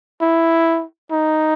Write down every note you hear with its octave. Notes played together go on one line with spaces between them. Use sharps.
E4
D#4